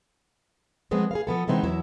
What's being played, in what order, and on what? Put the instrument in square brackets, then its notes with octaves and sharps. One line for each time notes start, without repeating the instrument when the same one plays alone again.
[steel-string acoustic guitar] F3 G#3 B3 C4 G#4
G#4 A#4 F5
F3 B3 A4
C3 E3 G#3 B3 C4 D#4
E2 F#3 E4 E5